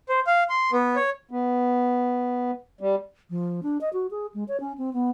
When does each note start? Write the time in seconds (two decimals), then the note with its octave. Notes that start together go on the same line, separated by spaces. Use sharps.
0.09 C5
0.27 F5
0.49 C6
0.72 B3
0.96 C#5
1.31 B3
2.81 G3
3.30 F3
3.63 D4
3.81 D#5
3.93 F#4
4.11 G#4
4.34 G#3
4.48 C#5
4.60 C#4
4.78 C4
4.93 B3